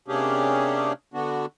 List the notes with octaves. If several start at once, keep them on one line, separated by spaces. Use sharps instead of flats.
C3 A#3 C#4 D4 G4 G#4
D3 B3 D4 F#4